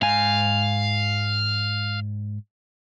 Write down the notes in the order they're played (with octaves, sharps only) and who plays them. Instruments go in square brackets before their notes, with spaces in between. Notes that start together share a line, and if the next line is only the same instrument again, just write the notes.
[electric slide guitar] G#2 G#5 [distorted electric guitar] F5